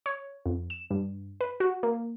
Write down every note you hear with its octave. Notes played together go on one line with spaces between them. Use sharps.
C#5
F2
E7
G2
B4
F#4
A#3